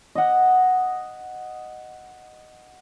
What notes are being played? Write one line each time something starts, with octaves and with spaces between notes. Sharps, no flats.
D#5 F#5